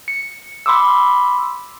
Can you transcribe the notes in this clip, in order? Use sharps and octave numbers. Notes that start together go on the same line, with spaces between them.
C#7
B5 C6 D6 E6